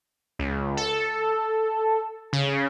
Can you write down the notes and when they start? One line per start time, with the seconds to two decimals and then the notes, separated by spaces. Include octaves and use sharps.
0.39 C#2
0.77 A4
2.33 C#3